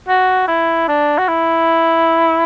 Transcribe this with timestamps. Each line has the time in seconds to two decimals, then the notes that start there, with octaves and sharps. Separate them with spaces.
0.08 F#4
0.48 E4
0.88 D4
1.18 F#4
1.28 E4